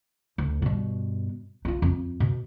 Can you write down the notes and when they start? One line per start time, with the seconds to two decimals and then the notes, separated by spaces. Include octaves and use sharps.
0.38 D2
0.62 G2 B2
1.65 D#4 F4
1.82 F2
2.20 B2